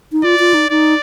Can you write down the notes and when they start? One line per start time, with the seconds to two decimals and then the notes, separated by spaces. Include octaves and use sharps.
0.12 D#4
0.23 F4 D5
0.39 F4
0.54 D#4
0.70 D#4 D5